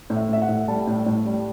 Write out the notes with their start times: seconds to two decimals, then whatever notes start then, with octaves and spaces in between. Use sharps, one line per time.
0.10 A2
0.16 E5
0.29 A2 E5
0.42 F#5
0.49 A2
0.68 G3 A5
0.87 A2
1.06 A2
1.26 G3